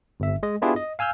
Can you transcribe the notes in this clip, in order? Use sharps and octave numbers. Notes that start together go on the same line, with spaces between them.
G1 E5
G#3 D#5
B3 D4 E4 F4 G4 G#4
D#5
F5 G#5 E6 F6 G6